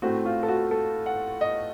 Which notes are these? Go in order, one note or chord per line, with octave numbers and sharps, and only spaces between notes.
A2 A3 C4 F#4
F4
A4
F#4
A4
F#5
D#5